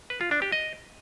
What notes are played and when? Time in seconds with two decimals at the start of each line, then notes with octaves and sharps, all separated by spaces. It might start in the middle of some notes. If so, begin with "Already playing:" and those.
0.10 B4
0.21 F4
0.31 D4
0.42 G4
0.52 D#5